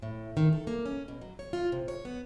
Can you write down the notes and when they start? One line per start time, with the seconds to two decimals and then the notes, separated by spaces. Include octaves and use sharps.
0.02 A2
0.37 D#3
0.53 A4
0.67 A#3
0.86 C#4
1.08 B2
1.21 F#3
1.39 C#5
1.53 F4
1.72 C3
1.88 C#5
2.05 B3